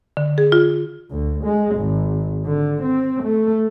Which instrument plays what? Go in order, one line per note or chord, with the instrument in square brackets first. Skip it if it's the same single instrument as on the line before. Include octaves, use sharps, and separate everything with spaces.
[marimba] D3
G#4
F4
[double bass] D2
G#3
G#1
D3
C4
A3